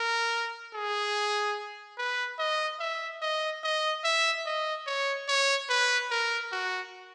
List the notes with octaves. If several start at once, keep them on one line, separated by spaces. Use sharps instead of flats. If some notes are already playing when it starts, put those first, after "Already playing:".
Already playing: A#4
G#4
B4
D#5
E5
D#5
D#5
E5
D#5
C#5
C#5
B4
A#4
F#4